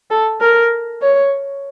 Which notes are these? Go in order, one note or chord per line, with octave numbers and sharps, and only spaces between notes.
A4
A#4
C#5